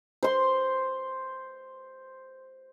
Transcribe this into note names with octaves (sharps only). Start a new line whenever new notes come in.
C5 C6